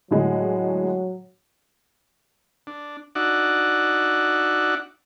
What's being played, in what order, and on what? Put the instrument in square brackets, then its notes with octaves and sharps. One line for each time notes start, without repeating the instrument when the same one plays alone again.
[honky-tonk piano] A2 D3 G#3 [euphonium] F#3
[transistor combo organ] D4
D4 D#4 F#4 D5 E5 F#5